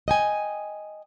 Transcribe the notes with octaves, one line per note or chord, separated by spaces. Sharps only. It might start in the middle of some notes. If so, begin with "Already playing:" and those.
D#5 G5 G#5